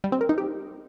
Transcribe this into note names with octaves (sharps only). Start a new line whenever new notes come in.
G3
C4
A#4
D#4
G4